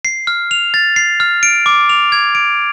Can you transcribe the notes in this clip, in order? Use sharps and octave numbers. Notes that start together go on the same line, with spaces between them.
C7
F6
F7
A6
C7
F6
D7
D6
F7
G#6
D7